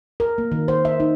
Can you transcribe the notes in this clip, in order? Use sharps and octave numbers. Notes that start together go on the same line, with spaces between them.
A#4
A#3
D#3
C5
E5
D#4